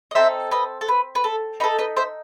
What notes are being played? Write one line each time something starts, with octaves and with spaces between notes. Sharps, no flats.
D#5
C4 D#4 A4 C5 E5
B4 D#5
A4
B4
B4
A4
D#4 A4 B4
B4 D#5
C5 E5